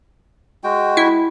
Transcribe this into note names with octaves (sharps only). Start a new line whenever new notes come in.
G#3 F#4 G5
E4